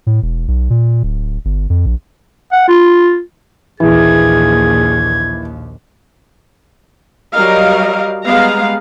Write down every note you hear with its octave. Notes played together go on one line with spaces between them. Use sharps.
A2
E1
B1
A#2
D1
G1
F2
A#1
F#5
F4
A#1 D#2 E3 G#4 G#6
F#3 G3 A#4 D#5 F5
G3 G#3 B3 F5 A#5